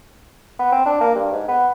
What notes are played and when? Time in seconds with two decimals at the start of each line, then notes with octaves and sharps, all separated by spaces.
0.59 B3
0.72 C4
0.86 D4
1.00 A#3
1.15 G2
1.32 G#2
1.48 B3